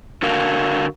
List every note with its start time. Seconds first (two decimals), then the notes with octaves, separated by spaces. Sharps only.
0.22 D3 F#4 A#4 F5